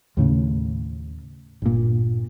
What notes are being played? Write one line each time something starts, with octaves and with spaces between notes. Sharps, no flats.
D#2 A2 C#3
G1 A#2